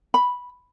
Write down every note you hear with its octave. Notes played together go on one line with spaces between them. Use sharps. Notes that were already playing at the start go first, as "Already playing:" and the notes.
B5